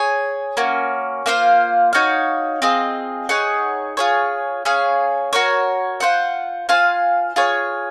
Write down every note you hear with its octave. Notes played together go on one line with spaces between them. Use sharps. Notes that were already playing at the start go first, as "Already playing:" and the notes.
Already playing: G#4 C#5 G#5
A#3 C#4 F#4
A#3 F4 C5 F5
D#4 F#4 C#5 F5
C4 F4 G#4 D#5
D#4 G#4 C#5 F#5
F4 G#4 C#5
C#4 G#4 C#5 F5
F#4 A#4 C#5
F4 C5 F#5
F4 C5 F5 G#5
F4 G#4 C#5